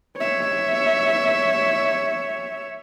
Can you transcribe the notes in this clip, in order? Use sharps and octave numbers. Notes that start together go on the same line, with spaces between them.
C#5 E5